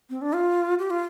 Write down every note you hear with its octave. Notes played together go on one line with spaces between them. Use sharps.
C4
D4
F4
G4
F4